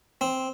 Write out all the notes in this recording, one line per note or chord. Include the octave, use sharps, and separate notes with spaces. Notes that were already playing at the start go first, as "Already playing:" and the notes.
C4